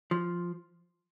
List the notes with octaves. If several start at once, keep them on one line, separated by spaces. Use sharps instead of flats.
F3